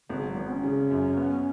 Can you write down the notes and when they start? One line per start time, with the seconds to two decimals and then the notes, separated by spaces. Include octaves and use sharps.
0.09 G#1 C#3
0.23 F#3
0.36 G#1 B3
0.50 C#4
0.63 C#3
0.90 F#2
1.17 B3